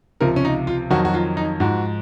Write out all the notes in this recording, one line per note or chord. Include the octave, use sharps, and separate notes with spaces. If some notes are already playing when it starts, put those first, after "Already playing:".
C#2 C3 F3 A#4
C#4
D#4
F4
F2 D#3 F#3 F#4
F#4
F4
D#4
G#2 F3 F#4